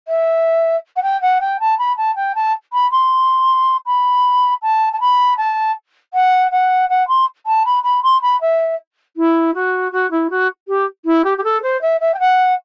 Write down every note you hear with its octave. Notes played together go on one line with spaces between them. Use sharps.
E5
F#5
G5
F#5
G5
A5
B5
A5
G5
A5
B5
C6
B5
A5
A5
B5
A5
F#5
F#5
F#5
C6
A5
B5
B5
C6
B5
E5
E4
F#4
F#4
E4
F#4
G4
E4
G4
G4
A4
C5
E5
E5
G5
F#5